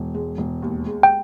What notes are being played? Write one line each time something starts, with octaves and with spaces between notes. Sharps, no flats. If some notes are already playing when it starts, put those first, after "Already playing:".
Already playing: E1
G#3
E1
D#2
G#3
G5